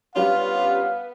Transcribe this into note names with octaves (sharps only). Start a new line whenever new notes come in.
G3 B3 C#4 D4 F4 F5